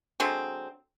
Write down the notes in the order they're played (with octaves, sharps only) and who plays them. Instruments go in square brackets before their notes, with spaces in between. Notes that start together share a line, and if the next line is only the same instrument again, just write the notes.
[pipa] D3 F#3 G#3 C4